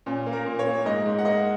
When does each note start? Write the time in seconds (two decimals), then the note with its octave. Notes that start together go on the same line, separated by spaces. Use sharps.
0.06 A#2 C#4
0.26 A#3
0.33 A#4
0.46 A#2
0.59 C#5
0.66 A#3
0.86 G#2 D#5
1.06 G#2
1.18 F#5
1.25 A#3 D#5